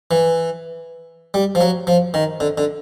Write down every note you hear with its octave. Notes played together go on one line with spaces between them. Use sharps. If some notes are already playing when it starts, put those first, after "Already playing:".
E3
G3
F3
F#3
F3
D#3
D3
D3